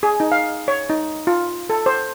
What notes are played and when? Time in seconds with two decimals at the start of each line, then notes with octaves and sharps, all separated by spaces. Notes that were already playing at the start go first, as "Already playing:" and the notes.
0.03 G#4
0.20 D#4
0.32 F5
0.68 C#5
0.90 D#4
1.27 F4
1.70 A4
1.86 C5